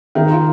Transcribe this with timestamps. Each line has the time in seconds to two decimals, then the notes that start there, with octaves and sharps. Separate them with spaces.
0.15 D#3 A#4
0.30 F4